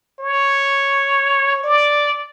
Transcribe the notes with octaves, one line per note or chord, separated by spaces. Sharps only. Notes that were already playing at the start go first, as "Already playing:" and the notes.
C#5
D5